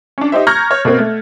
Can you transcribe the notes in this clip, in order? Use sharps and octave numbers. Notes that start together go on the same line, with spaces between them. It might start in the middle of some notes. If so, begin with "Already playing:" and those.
C#4 D4
D#4 G4 C5 E5
A#5 C#6 F6 G6 G#6 A#6
C#5
B2 A#3 C4
A3